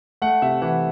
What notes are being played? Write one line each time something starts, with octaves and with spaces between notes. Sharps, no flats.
A3 F#5
C3 E5
E3 F#5